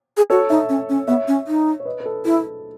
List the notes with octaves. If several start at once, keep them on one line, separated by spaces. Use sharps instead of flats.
G#4
F#4 A4 C#5
D#4 C#5 E5
C#4
C#4
B3 C#5 E5
C#4
D#4
C#5
B4 D#5
B4
A4
E4 A4